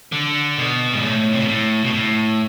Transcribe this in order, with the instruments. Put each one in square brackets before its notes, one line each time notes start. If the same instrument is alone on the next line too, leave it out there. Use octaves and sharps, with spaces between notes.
[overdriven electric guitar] D3
B2
G#2
A2
C3
B2
A2
B2
A2